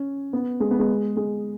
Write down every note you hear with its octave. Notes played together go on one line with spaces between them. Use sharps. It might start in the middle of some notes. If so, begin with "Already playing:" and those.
Already playing: C#4
B3
G#3
B3
G#3
G#3